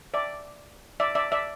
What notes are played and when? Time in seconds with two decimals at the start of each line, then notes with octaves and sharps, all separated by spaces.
0.14 D5 E5
1.00 D5 E5
1.15 D5 E5
1.32 D5 E5